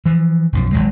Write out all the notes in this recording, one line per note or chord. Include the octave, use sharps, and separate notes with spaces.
E3 F3
B1 F#2 F3
G#1 C#2 F#3 G#3